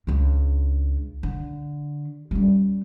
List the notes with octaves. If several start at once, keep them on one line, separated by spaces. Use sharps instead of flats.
C#2 D4
D3
G3 C#4